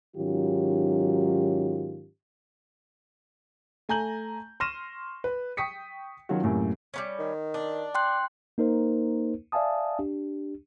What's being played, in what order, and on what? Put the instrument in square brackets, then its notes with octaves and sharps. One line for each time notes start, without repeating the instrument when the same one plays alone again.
[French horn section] G#2 D#3 F#3 C#4 F4 G4
[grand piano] A3 G#5 A#5 G6 F#7
C6 C#6 F6 A#6 D#7 E7
B4
G5 C#6 D#6 B6 C#7
D#3 F#3 C#4 F4 F#4
F#2 A2 C3 A#3
[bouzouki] G3 B3 C#4
[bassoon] D#3
[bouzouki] D4
[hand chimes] G5 C6 F#6
[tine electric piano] A#3 D#4 A#4 C5
D5 E5 F5 G#5 A5 D#6
D4 G4